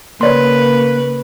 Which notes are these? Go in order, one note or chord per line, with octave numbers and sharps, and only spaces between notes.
C#3 A#3 B4 C#5 D5 C6